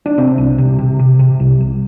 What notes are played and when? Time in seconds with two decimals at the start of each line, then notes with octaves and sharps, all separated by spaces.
0.06 D4
0.18 C3 C4
0.38 C2
0.58 C3
0.79 C3
0.99 C3
1.19 C3
1.40 C2
1.60 C2